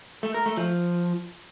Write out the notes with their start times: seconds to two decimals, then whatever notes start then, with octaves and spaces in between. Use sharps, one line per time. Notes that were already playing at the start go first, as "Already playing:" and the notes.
0.23 A3
0.34 A#4
0.46 A3
0.57 F3